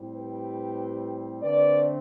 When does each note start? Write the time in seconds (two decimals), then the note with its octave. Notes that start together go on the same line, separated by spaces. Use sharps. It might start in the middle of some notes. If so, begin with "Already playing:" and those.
Already playing: A2 G3 C4
0.14 G4 B4
1.42 D3 A3 C4 B4 D5